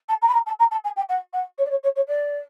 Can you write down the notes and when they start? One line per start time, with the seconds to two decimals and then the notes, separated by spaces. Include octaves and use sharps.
0.09 A5
0.22 A#5
0.28 B5
0.34 A#5
0.46 A5
0.59 A#5
0.71 A5
0.84 G#5
0.96 G5
1.09 F#5
1.33 F#5
1.58 C#5
1.65 D5
1.70 C#5
1.83 C#5
1.96 C#5
2.08 D5